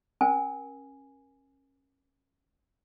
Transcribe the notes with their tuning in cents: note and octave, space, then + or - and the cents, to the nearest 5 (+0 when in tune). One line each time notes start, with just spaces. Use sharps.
C#4 -25 A#4 +20 G#5 +0